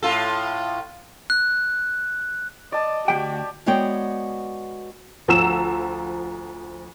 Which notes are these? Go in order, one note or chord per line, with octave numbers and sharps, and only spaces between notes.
A2 F4 A4
F#6
D5 D#5 A5
D2 D#3 F#4 G4 G5
G#3 B3 F#4 C#5 D5 G5
D2 F3 F#5 A#5 E6 E7